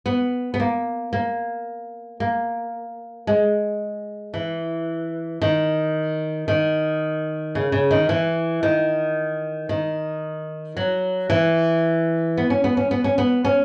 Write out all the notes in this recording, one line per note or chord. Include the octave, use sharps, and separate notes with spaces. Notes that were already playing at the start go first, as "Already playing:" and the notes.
B3
B3
A#3
A#3
A#3
G#3
E3
D#3
D#3
C#3
C#3
D#3
E3
D#3
D#3
F#3
E3
B3
C#4
B3
C#4
B3
C#4
B3
C#4